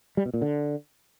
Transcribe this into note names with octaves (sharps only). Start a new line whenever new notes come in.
G3
B2
A#2
D3